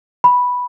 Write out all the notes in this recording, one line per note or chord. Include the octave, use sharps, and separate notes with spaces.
B5